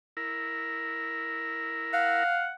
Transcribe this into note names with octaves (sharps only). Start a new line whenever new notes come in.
E4 A#4
F5 F#5